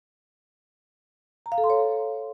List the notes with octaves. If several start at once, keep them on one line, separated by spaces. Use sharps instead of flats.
A#5
F5
A4
C6
C#5